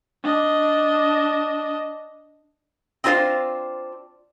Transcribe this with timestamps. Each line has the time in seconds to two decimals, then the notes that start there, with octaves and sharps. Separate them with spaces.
0.24 D4 D#5
3.04 C4 D4 F4 C5 F5